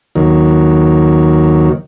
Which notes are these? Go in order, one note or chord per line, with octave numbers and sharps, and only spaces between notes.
D#2 D#3 F#3